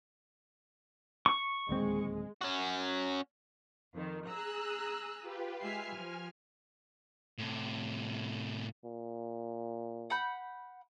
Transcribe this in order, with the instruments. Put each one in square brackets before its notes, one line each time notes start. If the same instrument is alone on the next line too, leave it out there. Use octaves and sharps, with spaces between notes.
[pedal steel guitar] C#6
[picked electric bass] D1 D#2 C4 [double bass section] G#3
[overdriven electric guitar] C#4 F#4
[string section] F2 D#3
[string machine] G#4 [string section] A#5 E6 F#6
[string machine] F4 G4 B4
[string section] G#3 E5 C7 [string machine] G#5 F6
[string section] F3
[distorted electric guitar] A2 C3
[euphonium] A#2
[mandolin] F#5 B5 G6